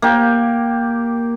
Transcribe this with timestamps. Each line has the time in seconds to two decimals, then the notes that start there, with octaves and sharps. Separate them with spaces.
0.02 A#3 G4